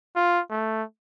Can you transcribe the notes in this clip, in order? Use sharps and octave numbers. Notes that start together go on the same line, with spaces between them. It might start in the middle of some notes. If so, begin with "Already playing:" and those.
F4
A3